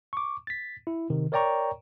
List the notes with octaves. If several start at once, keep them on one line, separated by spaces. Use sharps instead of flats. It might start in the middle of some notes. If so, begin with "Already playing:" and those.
C#6 D6
A6 B6
E4
C3 D#3
A#4 C#5 D5 G5 A#5 C#6